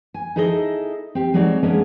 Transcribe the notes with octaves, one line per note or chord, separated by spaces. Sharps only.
G#5
D#4 E4 G#4 A4 B4 D#5
C4 G4
F#3 G#3 C4 D#4 C#5 D5
G#3 A#3 B3 C#4 D4 G#4